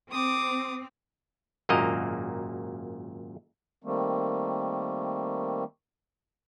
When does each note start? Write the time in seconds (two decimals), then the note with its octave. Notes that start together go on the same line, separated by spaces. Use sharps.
0.11 C4 D6 D#6
1.69 G#1 F#2 A#2 A#3 D#5 A#5
3.84 D#3 G3 A3 A#3 C4